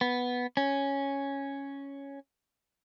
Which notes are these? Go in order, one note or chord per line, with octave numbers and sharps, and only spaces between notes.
B3
C#4